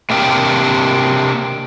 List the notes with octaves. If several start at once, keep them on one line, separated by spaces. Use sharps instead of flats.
C3 A#3 D4 G4 A#4 G5